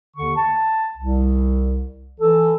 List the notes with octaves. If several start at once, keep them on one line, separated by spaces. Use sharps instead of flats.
D#2 D3 C#6
A5
C2
E3 A4